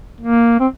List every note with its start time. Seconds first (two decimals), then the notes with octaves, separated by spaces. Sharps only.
0.21 A#3
0.60 C4